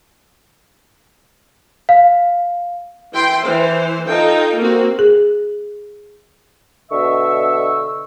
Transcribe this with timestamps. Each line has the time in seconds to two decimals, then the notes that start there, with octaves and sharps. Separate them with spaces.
1.89 F5
3.13 E3 E4 G5 C6
3.43 E3 C5
4.07 D#4 F4 A4 G5
4.58 A#3 C4 F#4
4.99 G#4
6.91 B2 D3 D#5 E5 C#6 E6